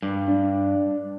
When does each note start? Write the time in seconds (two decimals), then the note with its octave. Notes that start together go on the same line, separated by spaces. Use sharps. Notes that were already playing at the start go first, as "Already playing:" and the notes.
0.02 G2
0.28 D4